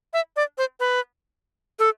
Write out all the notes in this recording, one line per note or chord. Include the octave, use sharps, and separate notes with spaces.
E5
D5
C5
B4
A4